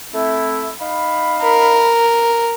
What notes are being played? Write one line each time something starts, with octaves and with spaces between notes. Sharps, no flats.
A3 C4 E4
D#4 F5 B5
A#4